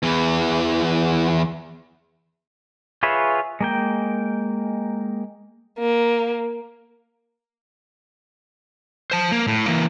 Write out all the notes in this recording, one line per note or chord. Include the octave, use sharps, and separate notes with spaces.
E2 E3
F4 G#4 B4 C#5 E5
G#3 A#3 G5
A#3
C5 A5
A#3
A2
E3 A#3